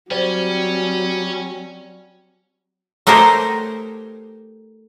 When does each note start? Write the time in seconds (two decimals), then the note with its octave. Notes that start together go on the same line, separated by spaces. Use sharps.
0.11 F#3 G3 C4 C#4 C5
3.07 A3 D#4 G4 A#4 C5 C#5